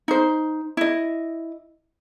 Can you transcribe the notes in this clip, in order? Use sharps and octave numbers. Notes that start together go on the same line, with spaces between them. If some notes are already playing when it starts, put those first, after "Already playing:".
D#4 C5
E4 D#5